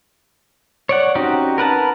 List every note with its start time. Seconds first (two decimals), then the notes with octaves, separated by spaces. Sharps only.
0.89 C#5 D5 F#5
1.15 C4 C#4 D#4 F#4 G4
1.58 A#4 B4 F#5 A5